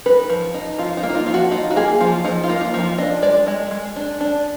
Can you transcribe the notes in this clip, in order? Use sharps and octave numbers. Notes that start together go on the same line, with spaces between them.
D#4 B4
F3
D#4
F3 F4
D#4
A#3
D#4
F4
F3 F4
F#4
D#4 F4
F#4
A#3 G#4
F3 F4
F3 D#4
F4
A#3
D#4
F3
F4
D4 D#5
G#3 D5
G#3 D#5
G#3
D4
D4